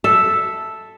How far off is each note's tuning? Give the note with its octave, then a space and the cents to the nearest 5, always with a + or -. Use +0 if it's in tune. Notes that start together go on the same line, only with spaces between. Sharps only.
A4 +0 E5 +0